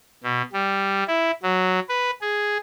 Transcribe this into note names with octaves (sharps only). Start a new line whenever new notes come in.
B2
G3
E4
F#3
B4
G#4